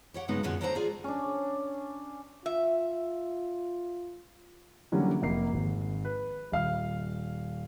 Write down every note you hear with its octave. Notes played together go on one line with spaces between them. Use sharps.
G4 C#5 F#5
G2 C#3 F#3 G#3 B3 D#4
F#2 A#2 D3 G#3 F#4 C#5
F#3 D4 G4 A4 C5 A#5
F4 G#4 D5
C#4 D4
F4 E5
D3 E3 F#3 G3 A#3 C#4
F1 A#3 A#4 C7
G#1
B4
D#1 F5 F6